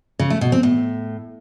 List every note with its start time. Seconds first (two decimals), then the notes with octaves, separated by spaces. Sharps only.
0.19 C#3
0.30 A3
0.41 B2
0.52 C4
0.63 A2